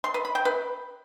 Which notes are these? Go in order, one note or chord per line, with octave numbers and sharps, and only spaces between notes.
C6
B4
B5
G5
B4